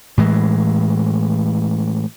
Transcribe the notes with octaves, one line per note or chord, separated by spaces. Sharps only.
A2 E3 G#3